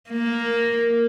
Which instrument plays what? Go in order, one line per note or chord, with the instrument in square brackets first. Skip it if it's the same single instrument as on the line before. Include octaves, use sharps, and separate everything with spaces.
[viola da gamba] A#3